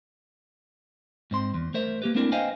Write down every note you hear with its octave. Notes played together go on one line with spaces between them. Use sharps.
G#2 C4 C6
E2
A3 A#4 C5 E5
A#3 G4 B4
A3 A#3 C4 D4 E4 A#4
B4 C5 D#5 F5 G5 G#5